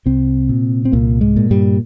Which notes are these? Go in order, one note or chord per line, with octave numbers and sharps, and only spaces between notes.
C2 C3 C4
A#2
C4
C2 A#2 A#3
G#2 G#3
A#2
G2 G3